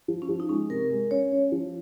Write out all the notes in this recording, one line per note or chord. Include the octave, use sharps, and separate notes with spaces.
F3
C#4
F3
D#4
G#3 C#4
C3 A#4
G#3 A#4
C#4 C#5
C#4
F3